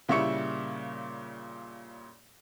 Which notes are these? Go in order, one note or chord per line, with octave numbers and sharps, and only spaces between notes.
A#2 C#3 G3 E4 C#6 C#7